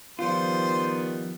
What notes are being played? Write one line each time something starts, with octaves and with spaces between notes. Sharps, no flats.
D#3 F3 G3 B3 F4 C5